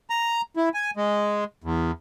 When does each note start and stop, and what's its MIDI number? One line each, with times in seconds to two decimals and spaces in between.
0.10 0.41 82
0.56 0.69 64
0.74 0.91 80
0.97 1.44 56
1.64 1.91 40